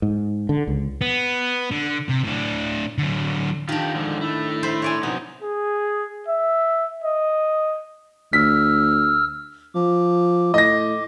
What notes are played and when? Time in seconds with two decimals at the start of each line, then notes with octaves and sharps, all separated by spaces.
0.02 G#2
0.49 D3
0.68 C#2
1.01 B3
1.71 D3
2.09 C3
2.24 A2 D4
2.98 D3 F#3
3.69 D#3 D4 F4 G4
3.95 D3 F3 G#3
4.21 A3 E4
4.63 C5 B5
4.82 C#5 D5 G#5
5.03 C3 F#3 B3 D#4
5.42 G#4
6.28 E5
7.04 D#5
8.33 D2 E6 F6 B6
9.75 F3 D6
10.54 A2 D#5 A#6